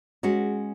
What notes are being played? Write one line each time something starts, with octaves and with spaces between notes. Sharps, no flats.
G#3 C#4 F#4